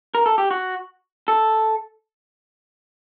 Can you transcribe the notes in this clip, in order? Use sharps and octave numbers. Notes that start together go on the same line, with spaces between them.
A#4
A4
G4
F#4
A4